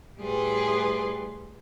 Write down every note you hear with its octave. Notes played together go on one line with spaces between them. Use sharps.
A2 G3 G#4 B4 C6